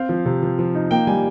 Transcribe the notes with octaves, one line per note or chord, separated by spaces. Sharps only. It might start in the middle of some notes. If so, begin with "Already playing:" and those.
Already playing: C4 F5
F3
C3
F3
F3
D#4
A#3 G5
G3 G#5